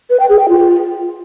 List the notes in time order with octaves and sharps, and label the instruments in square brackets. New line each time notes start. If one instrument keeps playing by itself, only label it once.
[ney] B4
G5
G#4
G5
F4